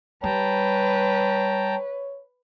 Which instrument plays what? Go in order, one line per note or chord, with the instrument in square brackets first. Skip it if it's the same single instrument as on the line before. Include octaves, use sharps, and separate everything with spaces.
[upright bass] G3 [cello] B4 [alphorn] C#5 [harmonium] G5 A5 A#5